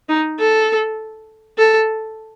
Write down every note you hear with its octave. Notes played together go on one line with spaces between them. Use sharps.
D#4
A4
A4